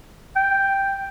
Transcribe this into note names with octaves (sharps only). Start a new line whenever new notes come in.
G5